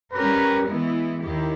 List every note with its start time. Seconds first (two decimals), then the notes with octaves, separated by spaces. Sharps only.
0.13 G3 C#4 G4 A#4 B4
0.68 E3 G#3 B3 E4
1.24 D#2 D#3 A#3 E4 G4